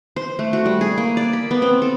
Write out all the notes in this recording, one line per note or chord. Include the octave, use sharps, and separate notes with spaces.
C5
A3
F#4
G3
G#4
A#3
D5
B5
B3
C4
A4